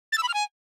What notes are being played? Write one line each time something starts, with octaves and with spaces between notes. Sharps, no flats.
A6
E6
B5
F6
G#5